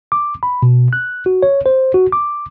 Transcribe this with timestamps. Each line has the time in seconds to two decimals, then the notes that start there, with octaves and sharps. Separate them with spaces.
0.12 D6
0.43 B5
0.63 B2
0.93 F#6
1.26 F#4
1.43 C#5
1.66 C5
1.94 F#4
2.13 D6